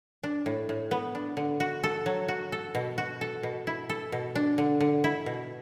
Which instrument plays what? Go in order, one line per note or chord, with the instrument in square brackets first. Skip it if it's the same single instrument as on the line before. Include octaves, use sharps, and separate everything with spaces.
[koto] D4
A2
A2
B3
D4
D3
F#4
A4
F#3
F#4
A4
B2
F#4
A4
B2
E4
A4
B2
D4
D3
D3
E4
B2